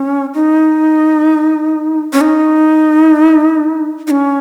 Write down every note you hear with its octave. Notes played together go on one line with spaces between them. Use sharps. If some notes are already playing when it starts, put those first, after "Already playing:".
Already playing: C#4
D#4
C#4
D#4
D#4
C#4